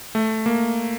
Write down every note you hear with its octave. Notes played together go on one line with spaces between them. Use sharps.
A3
A#3